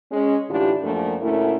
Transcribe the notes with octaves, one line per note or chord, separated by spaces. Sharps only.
G#3 C#4
A2 D3 E3 D4 F4 G4
F#2 F3 A3 A#3 D4
D2 A#2 A3 C#4 E4 A#4